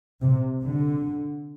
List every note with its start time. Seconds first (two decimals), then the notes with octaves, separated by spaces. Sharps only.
0.23 C3
0.63 D3